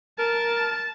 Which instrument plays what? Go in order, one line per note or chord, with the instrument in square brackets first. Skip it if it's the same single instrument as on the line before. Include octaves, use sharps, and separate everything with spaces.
[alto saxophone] A#4 [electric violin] A5